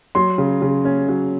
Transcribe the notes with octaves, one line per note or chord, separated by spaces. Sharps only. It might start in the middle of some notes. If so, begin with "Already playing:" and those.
F#3 C6
C#3
C#3
C#4
F#3